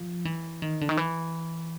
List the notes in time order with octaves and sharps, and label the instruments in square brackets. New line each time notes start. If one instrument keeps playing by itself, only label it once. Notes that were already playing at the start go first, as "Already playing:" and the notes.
Already playing: [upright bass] F3
E3
D#3
D3
D#3
E3